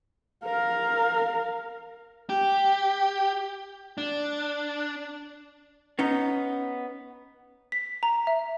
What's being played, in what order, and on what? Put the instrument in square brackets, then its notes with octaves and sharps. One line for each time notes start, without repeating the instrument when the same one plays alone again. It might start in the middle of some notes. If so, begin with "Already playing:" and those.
[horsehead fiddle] A#4 F5
[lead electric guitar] G4
D4
[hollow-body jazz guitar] B3 C#4 D#4
[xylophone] B6
A#5
E5